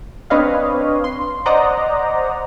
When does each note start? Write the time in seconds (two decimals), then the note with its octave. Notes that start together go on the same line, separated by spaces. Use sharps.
0.30 C4 D4 B4 C#5 D#5 F5
1.04 C6
1.46 C5 D5 D#5 F#5 A#5